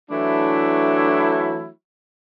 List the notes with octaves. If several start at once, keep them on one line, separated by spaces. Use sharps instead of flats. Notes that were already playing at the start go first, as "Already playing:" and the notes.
E3 F#3 A3 D4 E4